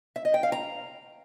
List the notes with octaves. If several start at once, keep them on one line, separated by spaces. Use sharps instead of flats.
E5
D#5
G5
F5
A#5